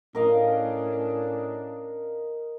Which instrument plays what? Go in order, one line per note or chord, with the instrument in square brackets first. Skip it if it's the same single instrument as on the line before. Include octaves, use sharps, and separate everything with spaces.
[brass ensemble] A2 C#4 D4 [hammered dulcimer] A#4 D#5 F5